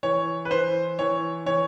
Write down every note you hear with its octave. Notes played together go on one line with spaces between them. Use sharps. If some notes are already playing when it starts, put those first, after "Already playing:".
E3 C#5
B4
E3 C5
E3 C#5
E3 C#5